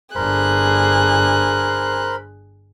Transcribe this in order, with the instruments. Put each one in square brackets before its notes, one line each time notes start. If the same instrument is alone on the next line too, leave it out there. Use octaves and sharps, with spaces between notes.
[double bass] G1 D4 [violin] G#4 F#6 [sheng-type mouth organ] A#4 C5 B5